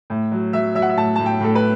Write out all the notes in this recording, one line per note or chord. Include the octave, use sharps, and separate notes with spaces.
A2
F#3
F#3 E5
F#3 E5
F#5
E5
A2 A5
A2 A5
G5
A2 A4
B4